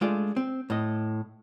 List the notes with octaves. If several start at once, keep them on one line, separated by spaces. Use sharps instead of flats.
G#3 A3 D4 F4 D5
C4
A2 D#5